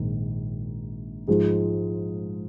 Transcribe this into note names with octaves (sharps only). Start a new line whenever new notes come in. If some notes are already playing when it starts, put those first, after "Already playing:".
Already playing: A#1 G#2 D#3
G#2 F3 G#3